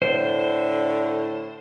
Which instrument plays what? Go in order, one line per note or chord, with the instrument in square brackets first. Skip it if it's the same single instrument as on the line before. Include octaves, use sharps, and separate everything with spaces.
[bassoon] A2 [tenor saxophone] D3 [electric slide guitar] C5